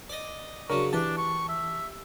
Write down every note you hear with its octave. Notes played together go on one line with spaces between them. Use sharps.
D5 D#5
C#3 F#3 D4 A#4 C#6
E3 D4 G4 A5
C#6
E5